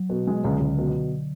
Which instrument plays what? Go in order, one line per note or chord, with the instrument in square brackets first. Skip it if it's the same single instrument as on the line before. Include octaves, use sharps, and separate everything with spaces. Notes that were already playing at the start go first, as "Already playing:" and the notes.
Already playing: [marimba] F#3
[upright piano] B2
G#3
[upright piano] C#2 [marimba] D3
[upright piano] C#2
B2